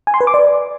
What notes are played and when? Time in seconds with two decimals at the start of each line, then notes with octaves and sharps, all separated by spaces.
0.07 G#5
0.14 C6
0.21 B4
0.27 D6
0.34 D5